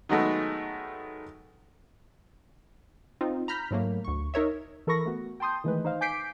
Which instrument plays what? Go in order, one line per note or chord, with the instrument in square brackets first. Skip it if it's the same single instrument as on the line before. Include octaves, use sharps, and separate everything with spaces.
[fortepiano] D#3 F#3 G#3 A3 B3
[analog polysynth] C4 D#4 F4
A#5 B5 F6 G6 B6
G#2 F#3 A3 A#3
D2 C#6
D#4 A#4 C#5 E5
[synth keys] E3 A4 A#4 B5 C#6 A#6
A3 B3 F#4
G5 A5 C6 D#6 G6
D#3 E3 G#3 A3 B4
D#4 C5 F5
G#5 D6 G6 B6 C7 D7